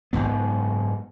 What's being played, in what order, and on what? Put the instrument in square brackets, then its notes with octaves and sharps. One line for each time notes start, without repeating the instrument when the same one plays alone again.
[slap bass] F#1 D#2 G#2 B3